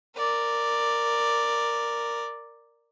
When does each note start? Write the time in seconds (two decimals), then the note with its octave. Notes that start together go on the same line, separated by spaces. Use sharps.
0.17 A#4 D5